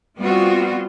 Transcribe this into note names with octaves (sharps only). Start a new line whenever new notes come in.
G3 B3 C4 F4 F#4